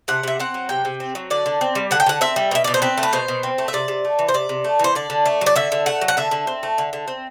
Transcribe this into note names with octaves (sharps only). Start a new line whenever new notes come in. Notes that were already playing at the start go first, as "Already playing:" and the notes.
C3 F#5
C3 E5
C4 F#5
F#3
C3 G5
C3
C4
F#3
D3 D5
D3
C4
G3
D3 F#5
G5
D3 F#5
C4 E5
G3
B2 E5
B2 D5
C5
C4 B4
A3
B4
B2 C5
B2
C4
A3
E5
C3 D5
C3
A3
E3
C5
C3 D5
C3
A3
E3 C5
D3 D5
D3
A3
F#3
D5
D3 E5
D3
A3 F#5
F#3
F#5
D3 E5
D3
C4
A3
D3
D3
C4